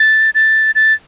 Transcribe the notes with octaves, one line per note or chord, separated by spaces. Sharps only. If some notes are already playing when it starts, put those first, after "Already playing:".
Already playing: A6
A6
A6